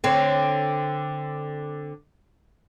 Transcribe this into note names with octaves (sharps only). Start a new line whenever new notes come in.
D3 C4 C#5